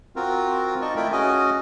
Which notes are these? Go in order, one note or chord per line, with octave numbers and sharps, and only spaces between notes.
C4 F4 F#4 A#4
D#4 D5 D#5 A5 C#6
A3 E4 F4 A#4 G5 B5
C#4 F#4 G#4 D#5 G#5